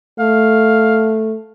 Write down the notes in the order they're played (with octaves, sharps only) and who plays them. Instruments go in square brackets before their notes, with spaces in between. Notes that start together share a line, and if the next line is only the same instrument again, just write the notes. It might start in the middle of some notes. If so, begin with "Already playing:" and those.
[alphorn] A3 [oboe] F5